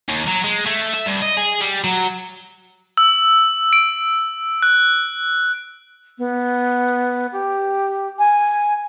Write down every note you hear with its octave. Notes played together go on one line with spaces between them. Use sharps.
D#2
F#3
G#3
A3
E5
G2
D#5
G#4
G3
F#3
E6
D7
F#6
B3
G4
G#5